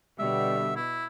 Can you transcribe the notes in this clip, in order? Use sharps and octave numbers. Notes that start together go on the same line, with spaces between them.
B2 D3 G3 E5
E4